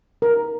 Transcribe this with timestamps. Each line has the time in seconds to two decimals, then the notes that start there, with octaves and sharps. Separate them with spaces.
0.22 A#4